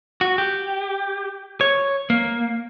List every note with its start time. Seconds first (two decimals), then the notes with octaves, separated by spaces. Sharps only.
0.21 F#4
0.38 G4
1.61 C#5
2.10 A#3